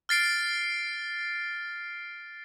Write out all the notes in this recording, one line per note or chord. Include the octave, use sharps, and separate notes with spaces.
F6 A6 C7 D7